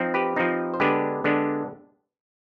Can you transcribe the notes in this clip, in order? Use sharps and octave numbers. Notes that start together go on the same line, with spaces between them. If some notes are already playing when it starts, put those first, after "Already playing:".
Already playing: F3 C4 D#4
G4 B4
F3 C4 D#4
C5
D3 G#3 B3 D4 G4 B4
D3 G#3 B3 D4